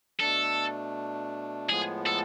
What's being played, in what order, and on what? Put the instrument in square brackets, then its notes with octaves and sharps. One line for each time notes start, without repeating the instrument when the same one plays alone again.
[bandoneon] B2 A3 D4 [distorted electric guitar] A4
[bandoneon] A2 F3 G#3 B3 [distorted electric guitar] G#4
[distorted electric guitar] A4